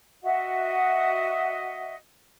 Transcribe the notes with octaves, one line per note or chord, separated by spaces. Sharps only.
F#4 D#5 E5 F#5